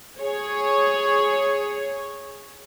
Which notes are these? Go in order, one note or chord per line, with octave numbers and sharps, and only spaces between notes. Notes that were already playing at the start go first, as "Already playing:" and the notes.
G#4 C#5